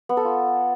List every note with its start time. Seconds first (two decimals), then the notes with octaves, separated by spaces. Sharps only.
0.09 B3
0.17 A4
0.25 F4